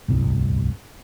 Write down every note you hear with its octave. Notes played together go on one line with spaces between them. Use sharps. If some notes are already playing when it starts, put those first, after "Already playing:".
D1 G1 C2